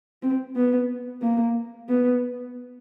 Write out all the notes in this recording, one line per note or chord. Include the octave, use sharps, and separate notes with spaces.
C4
B3
A#3
B3